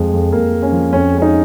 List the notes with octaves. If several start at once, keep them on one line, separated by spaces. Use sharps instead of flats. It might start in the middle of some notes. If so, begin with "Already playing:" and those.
Already playing: F2 G#3
F2
F2 A#3
G#3
C#4
F3
F2 C#4
G#3
C#4
D#4